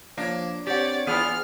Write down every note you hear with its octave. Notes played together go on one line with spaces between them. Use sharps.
F3 A#3 D4 C#5
C4 G4 C#5 D5 F#5
E2 B3 E4 F4 G#4 F6